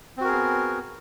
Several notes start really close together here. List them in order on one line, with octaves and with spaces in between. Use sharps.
C4 F#4 A#4 G#4 B3